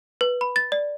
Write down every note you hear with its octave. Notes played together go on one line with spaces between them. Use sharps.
B4
B5
A6
D5